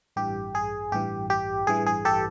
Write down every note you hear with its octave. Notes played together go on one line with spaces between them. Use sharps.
A1 G2 E3 G4
G#4
A1 G2 E3 G4
G4
A1 G2 E3 G#4
G#4
G4 A4